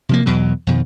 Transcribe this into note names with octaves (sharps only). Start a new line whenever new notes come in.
C3 F3 A#3
E2 B2 F#3
F2 B2 D#3